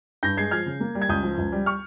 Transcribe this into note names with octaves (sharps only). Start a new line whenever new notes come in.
G2 G6 A#6
G#3 G#6 C7
F3 F6 G#6
C#3
A#3
G3
G#6
C#2 D#6 G6
F3
C#2
G3
C#6 F6